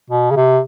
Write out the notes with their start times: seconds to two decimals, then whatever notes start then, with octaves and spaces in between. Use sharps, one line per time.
0.10 B2
0.31 C#3
0.36 C3